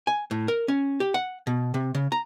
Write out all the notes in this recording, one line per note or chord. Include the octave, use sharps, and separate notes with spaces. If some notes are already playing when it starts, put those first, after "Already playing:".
G#5
A2
A#4
C#4
G4
F#5
B2
C3
C#3
A#5